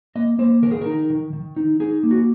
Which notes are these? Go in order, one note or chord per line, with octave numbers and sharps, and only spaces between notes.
A#3 D#5
A#3 C5
D#3 A#4
G#4
D#4 A#4
D#3
D#3
D#4
D#4 G#4
A#3
F#4